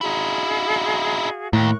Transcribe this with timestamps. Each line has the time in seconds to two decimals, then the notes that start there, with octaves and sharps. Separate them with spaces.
0.01 D#4 E4 F#4 G#4 F5
1.53 D#2 A2 A#4 C#6 F#6